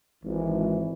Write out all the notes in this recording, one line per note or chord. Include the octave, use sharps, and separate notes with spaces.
G#1 E3